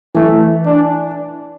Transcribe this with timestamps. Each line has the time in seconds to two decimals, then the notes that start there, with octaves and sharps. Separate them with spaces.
0.15 E3 A3
0.66 D4